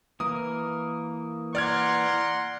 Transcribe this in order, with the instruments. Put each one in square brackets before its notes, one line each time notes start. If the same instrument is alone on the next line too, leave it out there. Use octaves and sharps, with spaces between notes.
[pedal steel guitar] E3 A#3 A#4 [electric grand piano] D#6
[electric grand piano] D5 F6 G#6 [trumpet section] F#5 A#5 C6